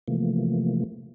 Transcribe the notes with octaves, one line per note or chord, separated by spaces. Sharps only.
C3 E3 F3 A3 A#3